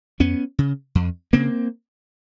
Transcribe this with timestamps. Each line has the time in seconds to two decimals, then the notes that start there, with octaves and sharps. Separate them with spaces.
0.20 F2 B3 C#4
0.59 C#3
0.95 F2
1.33 C#3 A#3 C4